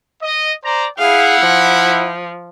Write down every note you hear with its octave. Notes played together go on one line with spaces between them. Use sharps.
D#5
C5 D5 A#5
E4 G#4 F5 F#5
F3